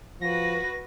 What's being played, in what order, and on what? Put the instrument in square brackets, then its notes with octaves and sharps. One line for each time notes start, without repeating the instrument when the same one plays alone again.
[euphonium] F3 [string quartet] F#4 B4 [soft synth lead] A#6